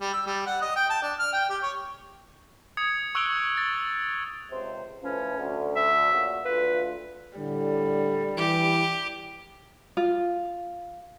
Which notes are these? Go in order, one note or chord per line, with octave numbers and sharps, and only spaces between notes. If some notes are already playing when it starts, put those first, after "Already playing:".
G3
E6
G3
F#5
D#5
G5
A5
D4
F6
G5
G4
C#5
D#6 G#6 C#7
C#6 E6 F#6 D7 F7 G7
A6
C#2 C3 C5
A2 F3 C#4 B4
D2
E5
A#2 C#3 F#4
D2 F4 B4
A2 D3 G3
E3 G4
F4